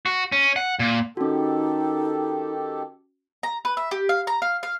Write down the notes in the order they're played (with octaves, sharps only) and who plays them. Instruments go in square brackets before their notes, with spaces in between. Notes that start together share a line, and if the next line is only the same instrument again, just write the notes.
[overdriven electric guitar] F#4
C#4
F#5
A#2
[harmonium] D#3 G4 A4 [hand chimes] C#4 F#4 [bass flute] D#4
[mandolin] A#5
B4
E5
G4
F5
A#5
F5
F5